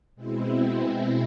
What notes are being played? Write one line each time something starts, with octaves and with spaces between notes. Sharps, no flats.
B2 G#3 C4 E4